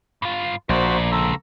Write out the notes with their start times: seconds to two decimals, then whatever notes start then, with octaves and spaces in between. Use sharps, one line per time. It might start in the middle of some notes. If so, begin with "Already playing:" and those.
0.22 G2 F4
0.69 A#1 F#4 A#4 C5 D5
1.12 C#2 A4 A#5 E6